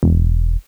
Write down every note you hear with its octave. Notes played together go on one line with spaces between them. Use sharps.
E1